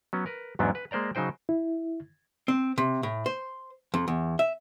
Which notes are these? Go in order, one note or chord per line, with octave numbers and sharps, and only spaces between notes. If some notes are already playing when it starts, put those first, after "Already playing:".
F#3 B3 C#4
A#4 B4
E2 G#2 F#3 B3 C#4 D4
B4
G#3 A#3 C5 D5 A#5
C#3 F#3 D#4 C5 G5
E4
C4
C3
A2
C5
F2
E2
E5